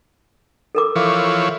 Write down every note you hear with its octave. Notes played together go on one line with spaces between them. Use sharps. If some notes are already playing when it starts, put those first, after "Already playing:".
A4 A#4 D6
E3 F3 C#5